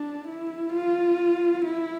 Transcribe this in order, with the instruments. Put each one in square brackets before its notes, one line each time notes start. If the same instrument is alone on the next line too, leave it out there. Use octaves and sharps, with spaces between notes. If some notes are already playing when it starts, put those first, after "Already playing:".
Already playing: [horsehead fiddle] D4
E4
F4
E4